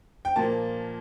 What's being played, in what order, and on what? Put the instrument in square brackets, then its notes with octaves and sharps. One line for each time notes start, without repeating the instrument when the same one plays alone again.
[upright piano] G5
A#2 F3 A#3 A5